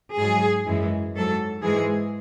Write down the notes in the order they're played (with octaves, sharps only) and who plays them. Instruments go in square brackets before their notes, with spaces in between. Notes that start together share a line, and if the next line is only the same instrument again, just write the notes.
[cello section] G#2 F#3 G#4
F#2 E3 G#3
G#2 F#3 A4
G#2 E3 G#3 G#4